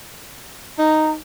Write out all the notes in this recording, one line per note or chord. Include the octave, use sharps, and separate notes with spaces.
D#4 A#5